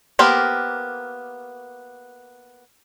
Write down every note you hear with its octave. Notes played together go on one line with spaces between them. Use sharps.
A#3 B3 G4 A#4 C5